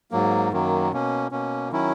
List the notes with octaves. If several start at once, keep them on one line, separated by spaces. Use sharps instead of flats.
G#2 F#3 A#3
F#2 D#3 F#3 A#3
B2 A#3 C#4
B2 A#3 C#4
D#3 F#3 C#4 E4